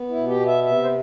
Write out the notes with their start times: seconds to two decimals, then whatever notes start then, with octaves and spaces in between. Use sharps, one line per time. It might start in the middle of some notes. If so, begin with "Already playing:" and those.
Already playing: B3
0.09 E4
0.15 B2
0.27 G4
0.40 B3
0.46 E5
0.64 C3 E5
0.83 C5